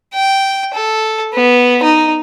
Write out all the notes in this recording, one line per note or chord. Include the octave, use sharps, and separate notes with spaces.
G5
A4
B3
D#4